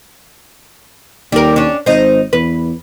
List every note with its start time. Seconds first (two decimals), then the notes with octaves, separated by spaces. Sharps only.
1.32 D#2 G3 A#4
1.56 C#4 D4
1.86 G#1 D#4 C5
2.33 E2 B4